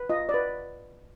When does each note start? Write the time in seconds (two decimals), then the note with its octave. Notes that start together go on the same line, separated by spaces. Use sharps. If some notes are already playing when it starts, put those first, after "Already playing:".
Already playing: B4
0.10 F4 D#5
0.29 D5
0.34 B4